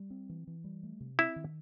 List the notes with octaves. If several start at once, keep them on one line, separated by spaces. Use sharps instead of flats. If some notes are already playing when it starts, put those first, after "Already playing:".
Already playing: G3
C4
E3
E3
G3
A3
C3
C4 E4
D#3